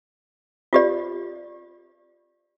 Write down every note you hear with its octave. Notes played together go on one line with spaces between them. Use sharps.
F4 G4 D5